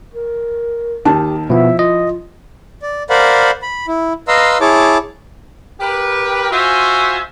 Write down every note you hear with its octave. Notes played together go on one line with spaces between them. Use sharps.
A#4
D#2 D#3 G4 A5
B2 F3 B3 E4 E5
F4 D#5
D5
A#4 C5 D5 F5 F#5 B5
B5
E4
B4 D#5 F5 A#5 C6 E6
E4 G#4 C#5 A5 D6
G4 A#4 B4
F4 F#4 C5 E5 G#5